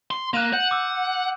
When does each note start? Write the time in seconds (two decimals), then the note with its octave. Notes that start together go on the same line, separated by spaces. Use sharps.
0.11 C6
0.34 A#3 F#6 D#7 E7
0.53 F#5 G6
0.71 D6 E6